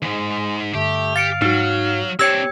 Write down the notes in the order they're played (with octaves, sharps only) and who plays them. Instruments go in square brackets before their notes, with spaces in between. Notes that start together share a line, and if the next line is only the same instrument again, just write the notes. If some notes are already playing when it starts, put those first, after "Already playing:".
[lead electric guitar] D#2 G#2 [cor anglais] G#3
[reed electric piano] G2 D3 [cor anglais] A3 [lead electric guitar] G4
[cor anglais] F5 [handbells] A6 C#7 D7
[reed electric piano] G#2 F#4 [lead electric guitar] F#3 [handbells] D#4
[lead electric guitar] C4 D4 [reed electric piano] G4 C#5 G5 [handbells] E6 G#6 C#7